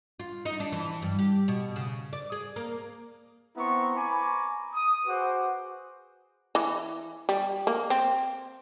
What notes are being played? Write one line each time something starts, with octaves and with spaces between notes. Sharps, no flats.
F4
D#4
D4
E3
G2
G4
B2
C#3
D5
G#4
A#3
B3 C4 E4 A#5 C6 C#6
G#5 A#5 B5 C#6 D6
D#6
F#4 G#4 B4 C5 F#5 D6
E3
G3
A#3
C4